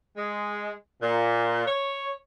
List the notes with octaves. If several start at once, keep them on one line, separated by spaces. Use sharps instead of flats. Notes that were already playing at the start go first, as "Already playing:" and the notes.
G#3
A#2
C#5